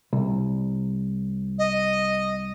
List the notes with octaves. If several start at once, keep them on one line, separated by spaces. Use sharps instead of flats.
C2
D#5